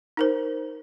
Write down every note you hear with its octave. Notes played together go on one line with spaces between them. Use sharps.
D#4 A#4 C5